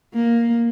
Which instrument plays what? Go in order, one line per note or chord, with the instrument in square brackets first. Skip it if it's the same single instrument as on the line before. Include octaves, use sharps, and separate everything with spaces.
[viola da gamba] A#3